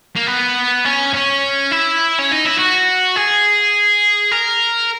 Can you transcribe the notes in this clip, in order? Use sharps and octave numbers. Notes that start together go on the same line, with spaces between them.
A#3
B3
C#4
C#4
E4
C#4
D#4
E4
F#4
G#4
A#4